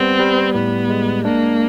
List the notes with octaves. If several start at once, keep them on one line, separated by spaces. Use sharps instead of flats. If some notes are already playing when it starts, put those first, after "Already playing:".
Already playing: G3 B3 C4
G3
A2 B3
G#3
A#3 D4